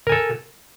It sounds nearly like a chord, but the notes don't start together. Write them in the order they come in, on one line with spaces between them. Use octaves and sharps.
A#4 G#5 A4